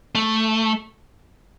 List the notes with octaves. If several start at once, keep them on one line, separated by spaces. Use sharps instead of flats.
A3